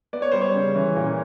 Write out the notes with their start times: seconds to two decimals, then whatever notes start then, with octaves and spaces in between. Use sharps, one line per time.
0.13 B3 D5
0.22 C#5
0.32 G3 C5
0.41 C#5
0.54 C#3
0.75 E3
0.96 A#2